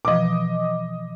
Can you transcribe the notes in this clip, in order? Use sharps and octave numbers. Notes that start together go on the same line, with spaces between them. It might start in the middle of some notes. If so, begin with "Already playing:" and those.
B2 E3 F3 D#5 D6